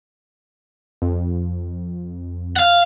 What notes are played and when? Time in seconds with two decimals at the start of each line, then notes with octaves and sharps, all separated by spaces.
1.02 F2
2.56 F5 F#5